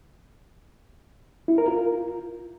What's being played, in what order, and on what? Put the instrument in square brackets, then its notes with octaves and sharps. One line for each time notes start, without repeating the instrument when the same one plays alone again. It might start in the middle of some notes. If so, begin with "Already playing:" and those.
[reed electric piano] E4
A#4
F4